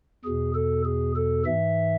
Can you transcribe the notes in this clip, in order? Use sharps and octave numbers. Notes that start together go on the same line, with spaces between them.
E2 B2 G#4
A4
G#4
A4
G#2 E3 E5